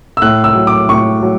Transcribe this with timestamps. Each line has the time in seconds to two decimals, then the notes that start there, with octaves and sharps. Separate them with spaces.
0.17 E6
0.22 A2 F#6
0.44 E6
0.55 F#3
0.67 D6
0.89 A2 C#6
1.23 F#3